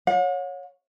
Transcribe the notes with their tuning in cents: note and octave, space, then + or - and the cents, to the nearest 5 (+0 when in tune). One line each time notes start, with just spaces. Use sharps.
C#5 +0 F#5 -45